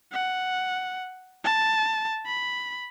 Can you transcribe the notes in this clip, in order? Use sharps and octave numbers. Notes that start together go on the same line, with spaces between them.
F#5
A5
B5